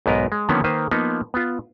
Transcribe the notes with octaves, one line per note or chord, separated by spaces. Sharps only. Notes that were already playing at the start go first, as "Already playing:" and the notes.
B1 G#2 B3 A#4 D#5
G#3
D3 D#3 F3 A#3 B3 C#4
D#3 A#3 B4 C5
F3 A#3 B3 D#4
B3 F4